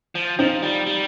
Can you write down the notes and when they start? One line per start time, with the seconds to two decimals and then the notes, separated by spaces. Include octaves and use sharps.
0.15 F3
0.39 F3 C4 D#4
0.63 G3
0.87 G3